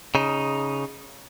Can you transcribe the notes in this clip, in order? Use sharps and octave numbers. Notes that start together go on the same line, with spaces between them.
C#3 D#4